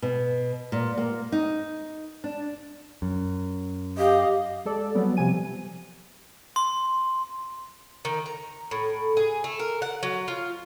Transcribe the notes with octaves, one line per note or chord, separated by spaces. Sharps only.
B2
A#2
A#3
D#4
D4
F#2
G4 D#5 F5
G#3 A4 D5
F#3 G3 B3
C3 F3 G#5 D#7
C6
D#3
A#5
A2
G#4
A3
A#4
F#5
F#3
F4